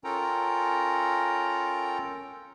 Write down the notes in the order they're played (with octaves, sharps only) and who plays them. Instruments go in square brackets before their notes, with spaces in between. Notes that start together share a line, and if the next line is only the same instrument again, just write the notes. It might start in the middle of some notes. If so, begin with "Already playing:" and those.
[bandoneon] C#4 F4 A4 A#4 G5 A#5